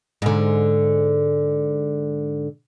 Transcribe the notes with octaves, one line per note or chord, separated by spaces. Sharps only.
G#2 D3